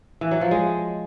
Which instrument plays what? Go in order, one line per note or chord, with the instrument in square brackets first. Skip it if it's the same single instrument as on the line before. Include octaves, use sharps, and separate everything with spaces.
[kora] E3
F#3
F3
G#3